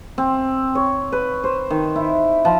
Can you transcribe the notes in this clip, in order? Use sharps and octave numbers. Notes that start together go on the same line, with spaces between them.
C4
C#5
B4
C5
D#3
E4
F3